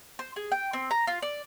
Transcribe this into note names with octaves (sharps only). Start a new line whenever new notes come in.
C5
G#4
G5
C4
A#5
F4
D5